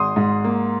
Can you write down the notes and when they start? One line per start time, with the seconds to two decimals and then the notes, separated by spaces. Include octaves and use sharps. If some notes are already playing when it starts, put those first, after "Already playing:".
Already playing: G#1 G#3 C6 D#6
0.16 G#2
0.44 A#3